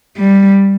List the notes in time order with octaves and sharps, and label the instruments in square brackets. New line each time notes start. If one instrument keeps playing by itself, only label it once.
[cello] G3